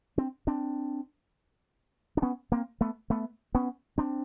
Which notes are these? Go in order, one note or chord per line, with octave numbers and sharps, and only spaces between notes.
C4 D4
C4 D4
D4
B3 C#4
A#3 C4
A3 B3
A3 B3
B3 C#4
C4 D4